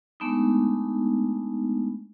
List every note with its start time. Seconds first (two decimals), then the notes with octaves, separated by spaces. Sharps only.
0.20 G#3 A3 B3 D4 D#4